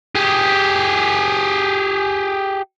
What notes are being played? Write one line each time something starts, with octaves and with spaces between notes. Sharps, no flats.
G4 G#4